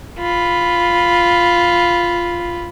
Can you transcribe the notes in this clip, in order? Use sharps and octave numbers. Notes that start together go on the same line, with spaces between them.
F4 B5